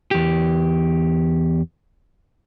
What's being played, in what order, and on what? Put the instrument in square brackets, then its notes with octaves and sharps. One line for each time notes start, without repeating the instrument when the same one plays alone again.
[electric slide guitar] E2 G4